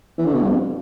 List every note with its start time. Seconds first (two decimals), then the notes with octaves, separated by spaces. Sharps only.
0.18 E3
0.26 D3
0.34 B2
0.42 G2
0.50 F2